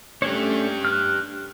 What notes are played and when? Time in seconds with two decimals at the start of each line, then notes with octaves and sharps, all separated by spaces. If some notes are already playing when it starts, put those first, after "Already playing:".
0.22 A3 C#4 D4 G4 C#5
0.85 F6 F#6